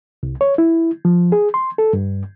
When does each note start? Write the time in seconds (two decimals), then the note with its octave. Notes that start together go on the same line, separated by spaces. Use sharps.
0.23 C2
0.41 C#5
0.58 E4
1.05 F3
1.32 G#4
1.54 C6
1.78 A4
1.93 G2